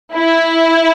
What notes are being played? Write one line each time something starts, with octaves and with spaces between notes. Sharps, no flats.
E4